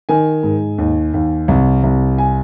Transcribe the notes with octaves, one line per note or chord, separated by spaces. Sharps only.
D#3 G#5
G#2
D#2
D#2
C2
C2
G#5